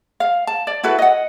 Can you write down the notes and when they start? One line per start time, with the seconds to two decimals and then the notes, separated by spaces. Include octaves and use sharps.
0.20 F5
0.47 A5
0.67 D5
0.83 E4 F#4 A4 B4
0.99 D#5 F#5